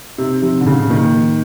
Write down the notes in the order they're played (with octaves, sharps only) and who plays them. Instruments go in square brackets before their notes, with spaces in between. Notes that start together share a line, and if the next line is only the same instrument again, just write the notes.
[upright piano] C3 [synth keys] D#4
[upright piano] C3 [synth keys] F3
[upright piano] D3
[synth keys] A2 [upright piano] C#3
[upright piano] D#3 [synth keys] A#3
[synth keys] D#4